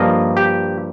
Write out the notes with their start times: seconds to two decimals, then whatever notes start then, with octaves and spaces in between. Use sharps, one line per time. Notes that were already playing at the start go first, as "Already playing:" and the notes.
Already playing: G2 F3 A#3 D#5
0.37 G4